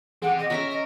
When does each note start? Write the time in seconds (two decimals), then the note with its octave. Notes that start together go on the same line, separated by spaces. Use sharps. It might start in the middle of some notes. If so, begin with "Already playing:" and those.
0.22 E3 C4 G4 G#4 F#5
0.38 D#5
0.50 C#4 A#4 E5 A#5
0.70 D#5